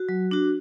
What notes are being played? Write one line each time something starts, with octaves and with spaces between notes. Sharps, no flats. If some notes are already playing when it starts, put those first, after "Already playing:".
Already playing: F#4
F#3
D4 F#4